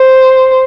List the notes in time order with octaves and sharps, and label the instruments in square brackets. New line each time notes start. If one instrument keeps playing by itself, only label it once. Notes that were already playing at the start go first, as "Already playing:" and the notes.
Already playing: [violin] C5